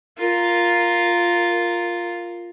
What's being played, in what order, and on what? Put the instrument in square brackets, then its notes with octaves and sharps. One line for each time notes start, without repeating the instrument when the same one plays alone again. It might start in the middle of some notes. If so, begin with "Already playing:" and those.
[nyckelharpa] F4 A#4